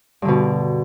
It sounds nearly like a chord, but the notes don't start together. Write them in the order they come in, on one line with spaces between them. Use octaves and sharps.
G2 D3 B2